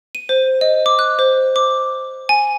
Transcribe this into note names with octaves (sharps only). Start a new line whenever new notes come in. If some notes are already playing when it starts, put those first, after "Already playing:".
D#7
C5
D#5
D6
F#6
C5
D6
G#5